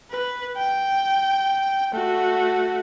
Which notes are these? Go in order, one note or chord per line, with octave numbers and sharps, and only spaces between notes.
B4
G5
A3 F#4